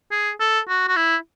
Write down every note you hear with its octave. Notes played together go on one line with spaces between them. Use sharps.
G#4
A4
F#4
F#4
E4